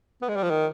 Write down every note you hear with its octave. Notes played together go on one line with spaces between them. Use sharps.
B3
G#3
G3
F3
D#3